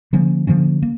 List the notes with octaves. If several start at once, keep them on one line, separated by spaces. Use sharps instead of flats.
D3 F3 A#3 C#4
D3 F3 A#3 C#4
A#3